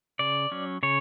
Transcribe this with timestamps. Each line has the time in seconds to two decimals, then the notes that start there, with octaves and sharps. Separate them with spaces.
0.19 C#3 D5
0.52 F#3 C#4
0.83 C#3 C#5